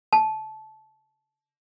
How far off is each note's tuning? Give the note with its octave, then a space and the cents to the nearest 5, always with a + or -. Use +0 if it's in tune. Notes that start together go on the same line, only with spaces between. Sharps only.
A5 -20